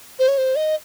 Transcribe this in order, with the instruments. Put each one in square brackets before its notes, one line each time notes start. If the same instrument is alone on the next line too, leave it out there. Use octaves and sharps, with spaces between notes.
[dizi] C5
C#5
C5
D#5